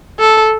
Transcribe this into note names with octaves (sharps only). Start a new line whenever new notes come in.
A4